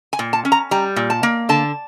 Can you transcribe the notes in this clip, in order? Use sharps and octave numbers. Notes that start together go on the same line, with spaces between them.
G#5
A#2
A5
C#4
A#5
G3 A#5
A#2
A5
A#3
D3 A5